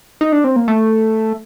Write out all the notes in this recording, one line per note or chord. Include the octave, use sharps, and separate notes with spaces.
D#4
D4
C4
A#3
A3